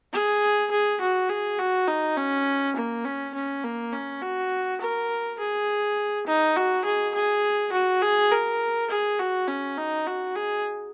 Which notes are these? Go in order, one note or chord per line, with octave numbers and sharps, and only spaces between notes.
G#4
G#4
F#4
G#4
F#4
D#4
C#4
A#3
C#4
C#4
A#3
C#4
F#4
A#4
G#4
D#4
F#4
G#4
G#4
F#4
G#4
A#4
G#4
F#4
C#4
D#4
F#4
G#4